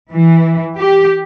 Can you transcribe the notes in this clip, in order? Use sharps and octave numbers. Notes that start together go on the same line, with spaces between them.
E3
G4